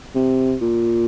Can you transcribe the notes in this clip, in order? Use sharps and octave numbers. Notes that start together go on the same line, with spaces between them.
C3
A#2